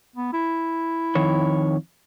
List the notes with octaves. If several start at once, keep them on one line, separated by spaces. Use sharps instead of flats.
B3
E4
F2 D#3 C#5